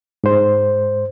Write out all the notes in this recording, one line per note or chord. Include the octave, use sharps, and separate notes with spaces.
G#2 C5